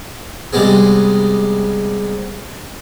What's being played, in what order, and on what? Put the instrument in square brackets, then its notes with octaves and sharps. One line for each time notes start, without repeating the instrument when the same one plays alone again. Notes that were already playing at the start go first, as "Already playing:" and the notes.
[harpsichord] C3 G3 G#3 B3 G#4